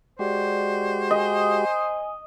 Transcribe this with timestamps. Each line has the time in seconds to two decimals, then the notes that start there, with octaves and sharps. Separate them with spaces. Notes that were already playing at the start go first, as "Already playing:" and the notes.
0.19 G#3 F#4 G4 C5 D5
1.11 D#5 G#5